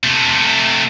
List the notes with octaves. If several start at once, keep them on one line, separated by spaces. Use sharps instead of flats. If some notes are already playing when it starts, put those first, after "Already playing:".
C3 A3